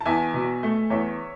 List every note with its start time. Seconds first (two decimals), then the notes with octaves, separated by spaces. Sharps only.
0.01 A5
0.05 E2 E5 G#5
0.34 B2
0.63 A3
0.90 E2 C#5 E5